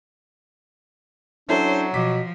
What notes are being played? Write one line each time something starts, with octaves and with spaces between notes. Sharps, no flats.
F#3 C#4 D4 E4 A4 C5
B2 F3 D6 B6